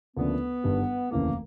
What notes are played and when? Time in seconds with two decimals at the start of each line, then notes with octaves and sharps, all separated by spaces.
0.17 D2 C#3 F3 A#3 B3 D4
0.64 G1 G2 D#3 G3
1.11 F1 D#2 C#3 E3 A3 A#3